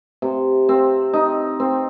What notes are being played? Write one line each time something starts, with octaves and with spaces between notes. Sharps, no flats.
C3
C4
D#4
C4